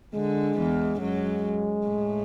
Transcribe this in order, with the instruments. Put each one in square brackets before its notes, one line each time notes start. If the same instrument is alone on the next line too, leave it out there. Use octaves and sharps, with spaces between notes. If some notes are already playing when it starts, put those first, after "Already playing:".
[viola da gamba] D3 [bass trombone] G#3
[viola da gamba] E2 E3
[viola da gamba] F#2 F#3 [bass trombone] G#3
[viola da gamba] A2 A3